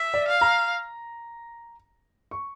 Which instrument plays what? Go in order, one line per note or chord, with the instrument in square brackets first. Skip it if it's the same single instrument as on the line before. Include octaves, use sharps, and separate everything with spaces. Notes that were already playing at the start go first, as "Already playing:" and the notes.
Already playing: [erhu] E5
[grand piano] D5
[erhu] F5
[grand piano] A#5
C#6